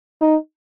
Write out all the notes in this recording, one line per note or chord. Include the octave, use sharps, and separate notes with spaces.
D#4